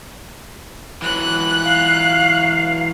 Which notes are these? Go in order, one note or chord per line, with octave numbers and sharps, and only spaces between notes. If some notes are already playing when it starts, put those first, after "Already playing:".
E3 F#3 F#6
F5